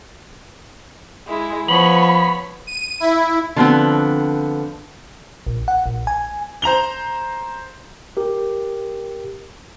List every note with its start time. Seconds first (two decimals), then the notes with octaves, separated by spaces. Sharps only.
1.28 G#3 E4
1.69 F3 B3 C#5 B5
2.67 D#7
3.00 E4
3.56 D3 F3 B3 C4
5.47 A#1
5.68 F#5
5.86 A#1
6.07 G#5
6.62 C5 A#5 F7 G7
8.17 G4 A#4